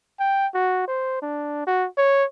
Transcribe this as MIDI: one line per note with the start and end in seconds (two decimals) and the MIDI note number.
0.19 0.47 79
0.54 0.84 66
0.88 1.21 72
1.22 1.64 62
1.67 1.87 66
1.98 2.24 73